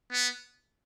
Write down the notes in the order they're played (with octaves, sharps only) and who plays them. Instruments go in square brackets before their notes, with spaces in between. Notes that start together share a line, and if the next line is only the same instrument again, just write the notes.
[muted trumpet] B3